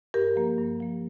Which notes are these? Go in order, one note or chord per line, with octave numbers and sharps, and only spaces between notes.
G2 G4 A#4
F3 A#3
G2
F3 A#3